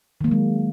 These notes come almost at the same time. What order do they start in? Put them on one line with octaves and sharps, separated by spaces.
D#3 A#3 F#3 G#3